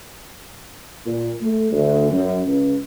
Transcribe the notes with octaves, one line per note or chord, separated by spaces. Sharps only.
A#2
A3
D2
F#2
C#2